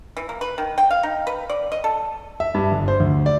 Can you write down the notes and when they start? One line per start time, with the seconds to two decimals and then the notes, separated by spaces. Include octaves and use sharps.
0.17 E3
0.29 A#3
0.41 B4
0.58 D#3
0.78 G5
0.90 F5
1.03 D#4
1.27 B4
1.50 D5
1.72 D#5
1.84 A4
2.40 E5
2.55 G2
2.72 G1
2.88 C5
3.00 D2
3.26 D5